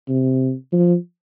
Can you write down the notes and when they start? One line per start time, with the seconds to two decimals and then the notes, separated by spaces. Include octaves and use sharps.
0.08 C3
0.72 F3